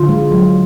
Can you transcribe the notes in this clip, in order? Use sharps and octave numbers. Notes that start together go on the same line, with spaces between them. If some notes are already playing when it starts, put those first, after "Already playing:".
Already playing: D3 F4
G#3
F#3